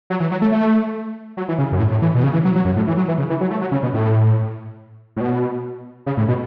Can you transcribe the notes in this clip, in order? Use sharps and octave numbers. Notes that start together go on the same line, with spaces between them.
F#3
E3
F#3
A3
A3
F#3
E3
C#3
F#2
A2
A2
E3
B2
C#3
E3
F#3
F#3
F#2
A2
E3
F#3
E3
C#3
E3
F#3
A3
F#3
C#3
B2
A2
A2
B2
C#3
A2
B2